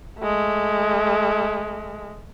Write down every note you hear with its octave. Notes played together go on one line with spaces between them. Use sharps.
G#3 A3